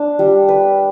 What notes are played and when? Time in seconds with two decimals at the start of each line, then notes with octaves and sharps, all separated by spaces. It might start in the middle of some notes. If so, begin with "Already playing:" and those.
Already playing: D4
0.19 G3
0.48 B4